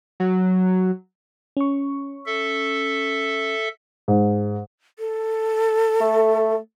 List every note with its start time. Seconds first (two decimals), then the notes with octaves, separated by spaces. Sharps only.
0.20 F#3
1.57 C#4 C#6
2.26 A4 E5
4.08 G#2
4.99 A4
6.00 A3